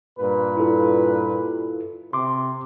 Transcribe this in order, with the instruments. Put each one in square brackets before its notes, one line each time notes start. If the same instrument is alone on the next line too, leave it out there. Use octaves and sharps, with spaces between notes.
[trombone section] G2 A#2 B4
[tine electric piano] E4 F4 A4
[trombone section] C3 [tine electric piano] C6 D6